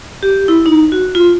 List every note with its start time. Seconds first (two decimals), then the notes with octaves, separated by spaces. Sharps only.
0.23 G4
0.48 E4
0.66 D#4
0.92 F#4
1.15 F4